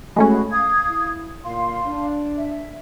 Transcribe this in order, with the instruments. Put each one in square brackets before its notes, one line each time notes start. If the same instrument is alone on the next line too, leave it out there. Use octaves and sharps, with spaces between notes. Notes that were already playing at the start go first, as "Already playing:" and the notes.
[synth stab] G#3 A3 C#4 [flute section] F#4 G#4 B5
[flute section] F5 D#6 G#6
[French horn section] E4
[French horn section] A#2 [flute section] F5 C6
[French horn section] D4
[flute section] E5